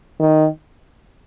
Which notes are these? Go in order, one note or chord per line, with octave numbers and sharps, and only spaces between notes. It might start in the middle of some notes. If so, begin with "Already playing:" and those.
D#3